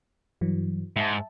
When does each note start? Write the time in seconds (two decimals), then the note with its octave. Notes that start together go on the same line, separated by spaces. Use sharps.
0.41 G2 E3 F#3
0.96 G#2 E5 A5